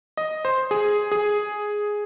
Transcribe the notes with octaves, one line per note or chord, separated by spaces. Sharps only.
D#5
C5
G#4
G#4